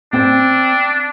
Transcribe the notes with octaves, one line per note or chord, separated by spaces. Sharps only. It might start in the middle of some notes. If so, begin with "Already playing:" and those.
C4 D4 G5